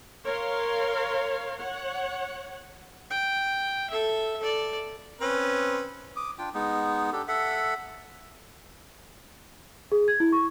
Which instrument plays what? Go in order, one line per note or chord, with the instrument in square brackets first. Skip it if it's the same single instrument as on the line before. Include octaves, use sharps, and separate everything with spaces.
[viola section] A#4 C#5 F5 C6
C#5 F#5
[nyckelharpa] G5
A4 E5
A4 D5
[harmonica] C4 C#4 B4
[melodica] D6 D#6
D4 F4 G5
G#3 B3 D#4
D4 G4 A4
A4 E5 F#5
[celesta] G#4
G#6
E4
C#6